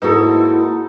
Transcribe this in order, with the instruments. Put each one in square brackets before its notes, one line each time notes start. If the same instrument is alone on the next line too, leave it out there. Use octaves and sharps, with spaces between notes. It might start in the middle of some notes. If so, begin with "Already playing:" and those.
[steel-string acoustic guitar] G#2 A#3 F#4 [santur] D#4 A4 [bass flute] E4 [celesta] G#4 B4